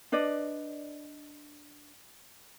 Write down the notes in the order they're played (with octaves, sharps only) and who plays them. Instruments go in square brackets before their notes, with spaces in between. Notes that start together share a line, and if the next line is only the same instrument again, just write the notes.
[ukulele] D4 B4 D5 D#5